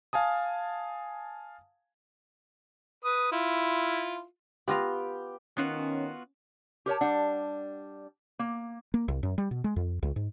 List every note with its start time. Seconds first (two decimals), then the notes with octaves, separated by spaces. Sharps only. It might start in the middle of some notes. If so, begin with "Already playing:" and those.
0.13 F5 G#5 A5 D#6
3.05 B4 D#6
3.32 E4 F4
4.68 B3 F4 G4 A#5
5.58 D#3 B3 C#4 F4 F#4
6.86 G4 A#4 C#5 A5
7.01 G3 D4 F#5
8.39 A#3
8.94 A#3
9.08 C2
9.23 F#2
9.38 G3
9.51 B2
9.64 G#3
9.76 F2
10.03 C#2
10.16 G#2